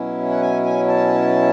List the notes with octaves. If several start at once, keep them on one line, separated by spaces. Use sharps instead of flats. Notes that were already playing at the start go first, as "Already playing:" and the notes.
Already playing: B2 F#3 C#4 E4
F#5
G#5
G#5
A5